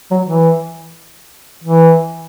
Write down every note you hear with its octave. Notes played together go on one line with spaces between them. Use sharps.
F#3
E3
E3